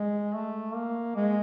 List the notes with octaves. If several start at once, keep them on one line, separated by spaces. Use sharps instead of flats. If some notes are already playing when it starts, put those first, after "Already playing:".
Already playing: G#3
A3
A#3
G#3